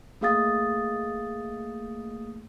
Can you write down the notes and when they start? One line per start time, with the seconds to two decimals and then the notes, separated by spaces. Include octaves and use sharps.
0.21 A3 A#3 G#4 F5 D#6 A6